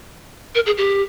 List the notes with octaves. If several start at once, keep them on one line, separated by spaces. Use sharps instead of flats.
A#4
G#4
G4